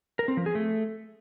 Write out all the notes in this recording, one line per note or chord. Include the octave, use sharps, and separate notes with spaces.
A#4
C4
F3
G#4
A3